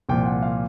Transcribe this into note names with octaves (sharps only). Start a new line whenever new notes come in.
C2 A#2 F3 G5
F#5
F5